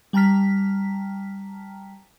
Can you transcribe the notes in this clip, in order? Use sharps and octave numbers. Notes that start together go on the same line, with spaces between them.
G3 G5 A5 A#5 F6 B6